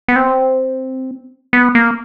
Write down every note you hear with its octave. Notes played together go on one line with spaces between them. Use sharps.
B3
C4
B3
A#3